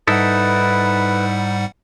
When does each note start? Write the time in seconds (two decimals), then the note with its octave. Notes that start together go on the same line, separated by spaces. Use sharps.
0.07 G#2 G3 D#4 E4 A4 B4 F#5